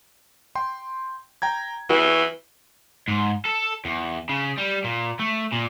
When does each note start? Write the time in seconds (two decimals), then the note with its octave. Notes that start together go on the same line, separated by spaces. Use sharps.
0.55 G5 C6
1.42 G5 A#5 G#6
1.89 E3 F#4
3.08 G#2
3.46 A4
3.85 E2
4.29 C#3
4.58 G3
4.84 A#2
5.19 A3
5.52 A#2